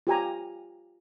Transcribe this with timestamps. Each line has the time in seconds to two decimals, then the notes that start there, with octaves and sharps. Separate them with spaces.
0.07 F4 G4 G#5 A#5